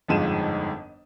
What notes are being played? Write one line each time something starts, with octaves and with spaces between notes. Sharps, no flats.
G1 F2 G#2 F3 D#7 E7